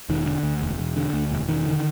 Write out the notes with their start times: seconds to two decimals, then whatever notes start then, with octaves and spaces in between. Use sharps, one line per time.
0.09 E1 D#3
0.26 D3
0.43 D2
0.62 E1
0.79 E1
0.96 D3
1.13 D2
1.31 E1
1.49 E1 D#3
1.66 D3